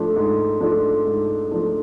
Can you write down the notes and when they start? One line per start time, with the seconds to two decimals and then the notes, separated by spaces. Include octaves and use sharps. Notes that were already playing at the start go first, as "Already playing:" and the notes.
Already playing: G#2 F3 A3 D4
0.16 G#2
0.60 F3 A3 D4
1.05 G#2
1.51 F3 A3 D4